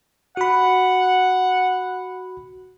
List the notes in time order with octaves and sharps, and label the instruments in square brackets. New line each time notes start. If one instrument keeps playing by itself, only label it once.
[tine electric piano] F#4 B5 [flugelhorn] F#5